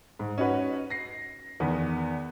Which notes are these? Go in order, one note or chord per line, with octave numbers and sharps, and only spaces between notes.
G#2
C#4 D#4 F#4 B4
A#6 C7
E2 D#3 B3